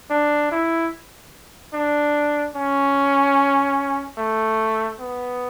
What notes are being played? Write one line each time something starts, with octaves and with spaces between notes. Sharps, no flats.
D4
E4
D4
C#4
A3
B3